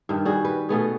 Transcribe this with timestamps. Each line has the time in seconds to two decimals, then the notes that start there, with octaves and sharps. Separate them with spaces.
0.09 G2 D#3
0.25 G3 F#4 G#4
0.45 B4
0.69 B2 A3 B3 G#4